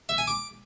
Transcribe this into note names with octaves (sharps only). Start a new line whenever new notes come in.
E5
G#5
D6